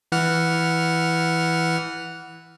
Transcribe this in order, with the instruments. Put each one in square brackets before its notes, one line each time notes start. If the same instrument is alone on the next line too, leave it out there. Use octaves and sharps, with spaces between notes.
[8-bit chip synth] E3 F#5 F6